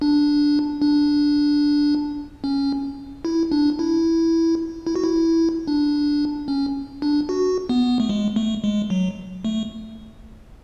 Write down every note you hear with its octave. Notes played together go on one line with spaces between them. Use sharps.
D4
D4
C#4
E4
D4
E4
E4
F#4
E4
D4
C#4
D4
F#4
B3
A3
G#3
A3
G#3
F#3
A3